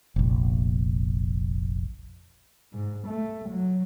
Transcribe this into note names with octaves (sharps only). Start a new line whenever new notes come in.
F1 A#1
G#2
A3
F#3